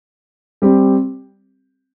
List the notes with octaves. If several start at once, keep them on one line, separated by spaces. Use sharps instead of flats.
G3 C4 G4